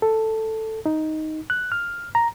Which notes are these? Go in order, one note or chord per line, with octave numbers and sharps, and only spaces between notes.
A4
D#4
F#6
F6
A#5